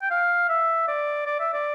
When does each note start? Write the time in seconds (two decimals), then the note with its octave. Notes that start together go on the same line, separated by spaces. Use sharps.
0.02 G5
0.11 F5
0.49 E5
0.88 D5
1.26 D5
1.39 E5
1.54 D5